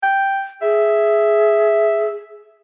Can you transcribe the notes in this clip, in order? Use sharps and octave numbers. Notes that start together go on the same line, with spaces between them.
G5
G#4 E5